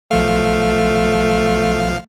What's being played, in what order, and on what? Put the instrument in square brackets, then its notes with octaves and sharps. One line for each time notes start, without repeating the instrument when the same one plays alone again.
[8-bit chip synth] B1 F3 F5 [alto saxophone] A3